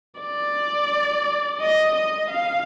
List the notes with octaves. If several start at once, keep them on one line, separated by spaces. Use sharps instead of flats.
D5
D#5
D#5
F5